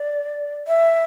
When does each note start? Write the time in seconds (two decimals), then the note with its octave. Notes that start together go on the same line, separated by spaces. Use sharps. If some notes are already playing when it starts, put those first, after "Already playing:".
Already playing: D5
0.68 E5